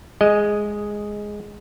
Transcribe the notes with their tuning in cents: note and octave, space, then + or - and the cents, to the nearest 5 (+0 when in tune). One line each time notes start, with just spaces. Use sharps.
G#3 +0 D#5 +0